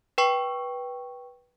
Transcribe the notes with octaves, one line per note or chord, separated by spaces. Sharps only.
B4 G5 C#6